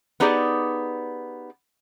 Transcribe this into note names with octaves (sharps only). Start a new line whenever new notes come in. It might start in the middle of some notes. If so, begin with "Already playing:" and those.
B3 D#4 G4 G#4 D5